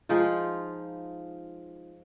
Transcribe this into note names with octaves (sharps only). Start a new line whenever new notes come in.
F3 G#3 D#4 F4